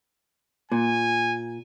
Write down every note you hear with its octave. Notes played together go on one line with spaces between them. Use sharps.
A#2 G#5